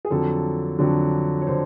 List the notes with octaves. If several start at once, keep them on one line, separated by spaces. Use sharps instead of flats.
G#4
F2 D3 F#3 A4
F2 D3 F#3
C#5
D3 C5